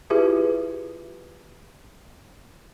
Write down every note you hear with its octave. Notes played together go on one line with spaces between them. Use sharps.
E4 F4 G4 G#4 B4 E5